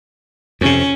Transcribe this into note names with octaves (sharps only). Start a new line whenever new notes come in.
F2 C3 C#4